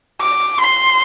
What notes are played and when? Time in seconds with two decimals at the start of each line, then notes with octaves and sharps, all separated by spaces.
0.21 D6
0.61 C6